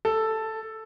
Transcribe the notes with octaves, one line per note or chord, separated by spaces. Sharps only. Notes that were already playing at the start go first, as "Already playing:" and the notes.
A4